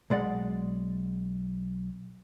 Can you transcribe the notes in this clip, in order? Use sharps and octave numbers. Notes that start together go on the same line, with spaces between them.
B1 G#3 D5 F#5